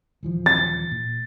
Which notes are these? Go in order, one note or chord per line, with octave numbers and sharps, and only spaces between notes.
D#1 E3 F3
A6
A#2